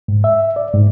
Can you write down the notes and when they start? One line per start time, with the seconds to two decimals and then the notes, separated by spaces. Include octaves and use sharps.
0.08 G#2
0.24 E5
0.56 D5
0.74 G#2